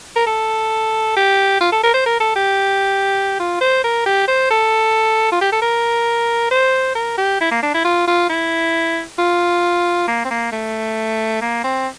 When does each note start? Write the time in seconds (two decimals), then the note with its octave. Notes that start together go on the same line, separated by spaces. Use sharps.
0.16 A#4
0.26 A4
1.17 G4
1.61 F4
1.72 A4
1.83 A#4
1.94 C5
2.06 A#4
2.20 A4
2.36 G4
3.40 F4
3.61 C5
3.84 A#4
4.06 G4
4.28 C5
4.50 A4
5.32 F4
5.41 G4
5.52 A4
5.62 A#4
6.51 C5
6.95 A#4
7.18 G4
7.40 E4
7.51 A#3
7.63 D4
7.74 E4
7.84 F4
8.07 F4
8.29 E4
9.19 F4
10.08 A#3
10.25 C4
10.31 A#3
10.52 A3
11.41 A#3
11.64 C4